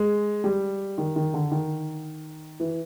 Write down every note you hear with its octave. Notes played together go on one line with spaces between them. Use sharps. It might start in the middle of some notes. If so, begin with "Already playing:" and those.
Already playing: G#3
G3
D#3
D#3
D3
D#3
E3